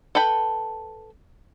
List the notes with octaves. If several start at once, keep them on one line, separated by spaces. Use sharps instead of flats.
A4 B4 G5 B5